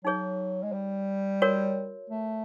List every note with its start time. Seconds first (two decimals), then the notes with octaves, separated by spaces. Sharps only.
0.05 F#3 D#4 G#4 C#5
0.63 G#3
0.73 G3
1.42 F#4 A#4 C#5
2.10 A3